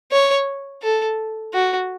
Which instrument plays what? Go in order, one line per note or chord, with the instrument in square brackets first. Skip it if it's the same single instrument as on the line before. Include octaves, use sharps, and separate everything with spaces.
[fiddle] C#5
A4
F#4